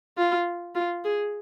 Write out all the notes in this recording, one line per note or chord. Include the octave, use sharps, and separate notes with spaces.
F4
F4
G#4